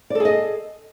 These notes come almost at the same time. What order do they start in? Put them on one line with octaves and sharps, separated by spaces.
D5 A4 G#4 D#5